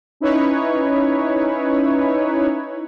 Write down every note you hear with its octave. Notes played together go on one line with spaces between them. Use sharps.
C#4 D#4 E4 B4 C#5